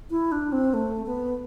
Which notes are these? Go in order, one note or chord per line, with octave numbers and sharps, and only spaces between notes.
E4
D4
C4
A3
B3